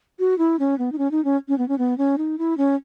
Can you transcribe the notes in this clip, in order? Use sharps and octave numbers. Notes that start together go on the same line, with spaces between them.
F#4
E4
C#4
B3
D#4
C#4
D#4
C#4
C#4
B3
C#4
B3
C#4
D#4
E4
C#4